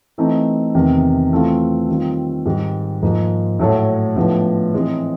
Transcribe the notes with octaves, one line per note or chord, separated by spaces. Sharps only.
E3 A3 C4 D#4
E2 C3 D#3
E3 A3 C4 F4
D#3 G3 C4 F4
G#2 D#3 G3
G#2 F3 A#3 D#4
A2 F#3 A3
A2 F3 G#3 B3 D4
E3 G#3 C4